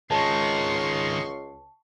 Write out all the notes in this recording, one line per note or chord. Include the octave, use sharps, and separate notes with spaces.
C#2 D#3 G#3 A5 C6 C#6